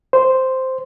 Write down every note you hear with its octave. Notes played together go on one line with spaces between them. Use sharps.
C5